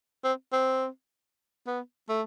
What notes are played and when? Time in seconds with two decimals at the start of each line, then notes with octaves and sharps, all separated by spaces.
0.24 C4
0.53 C4
1.67 B3
2.09 A3